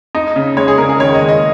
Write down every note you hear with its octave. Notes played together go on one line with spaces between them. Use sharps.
D#4
C#3
G#3 C#5
G#4
C#3 A#4
G#4
D#3 C#5
D#5
G#3
D#5